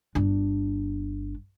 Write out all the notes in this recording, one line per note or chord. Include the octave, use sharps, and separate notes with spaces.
G1 D4